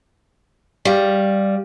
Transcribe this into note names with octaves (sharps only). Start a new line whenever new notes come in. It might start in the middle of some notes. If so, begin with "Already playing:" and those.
G3 G4 F5